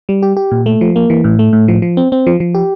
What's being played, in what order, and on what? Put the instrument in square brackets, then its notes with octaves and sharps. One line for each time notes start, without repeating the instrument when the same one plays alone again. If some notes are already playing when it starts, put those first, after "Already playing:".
[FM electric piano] G3
G4
G4
A#2
A3
F3
A#3
E3
A2
A3
A2
F3
F3
C4
C4
F3
F3
G4